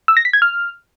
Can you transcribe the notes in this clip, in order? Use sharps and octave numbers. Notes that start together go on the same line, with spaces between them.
E6
A#6
B6
G#6
F6